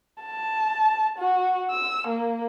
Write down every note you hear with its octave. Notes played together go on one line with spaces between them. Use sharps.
A5
F#4
E6
A#3